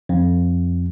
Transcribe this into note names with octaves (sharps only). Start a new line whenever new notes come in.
F2